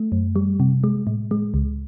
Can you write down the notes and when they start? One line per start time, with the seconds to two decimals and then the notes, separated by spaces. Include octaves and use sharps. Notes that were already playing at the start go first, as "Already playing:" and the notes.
Already playing: A3
0.12 F#2
0.36 G3
0.60 C3
0.84 G#3
1.07 A2
1.31 G#3
1.54 C#2